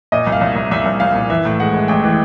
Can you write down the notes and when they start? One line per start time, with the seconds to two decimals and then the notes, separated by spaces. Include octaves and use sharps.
0.12 A#2 D#5
0.27 C2
0.32 F5
0.41 C2
0.52 C2 E5
0.71 C2 E5
0.86 C2
1.00 C2 F5
1.15 A#2
1.30 E3 E5
1.45 A2
1.60 G#3 F#5
1.74 G#3
1.88 A1 G5
2.04 E3